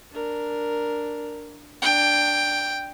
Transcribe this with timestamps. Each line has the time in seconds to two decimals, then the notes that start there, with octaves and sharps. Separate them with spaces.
0.12 D4 A#4
1.82 D4 G5